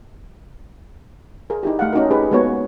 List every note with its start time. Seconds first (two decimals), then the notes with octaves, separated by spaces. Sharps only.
1.50 G#4 A#4
1.63 D#4 E4 G4
1.79 A3 F5 F#5
1.93 C#4 D#4 F#4 A#4
2.11 C#4 D#4 G4 G#4 B4
2.31 G#3 A#3 B3 F#4 C#5